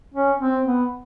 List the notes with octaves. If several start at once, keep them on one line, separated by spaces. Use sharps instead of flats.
C#4
C4
B3